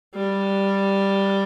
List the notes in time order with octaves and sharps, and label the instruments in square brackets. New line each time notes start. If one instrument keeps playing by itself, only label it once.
[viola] G3